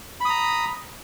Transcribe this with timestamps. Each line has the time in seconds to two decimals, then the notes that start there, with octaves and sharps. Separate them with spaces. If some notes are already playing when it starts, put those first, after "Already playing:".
0.21 B5
0.25 D#6
0.30 A#5